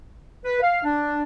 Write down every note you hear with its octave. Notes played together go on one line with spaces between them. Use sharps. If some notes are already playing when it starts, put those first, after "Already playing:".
B4
F5
D4